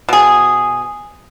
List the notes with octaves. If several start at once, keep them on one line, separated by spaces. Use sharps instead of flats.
B2 G#4